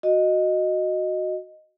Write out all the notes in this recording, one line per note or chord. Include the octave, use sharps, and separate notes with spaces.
F#4 D#5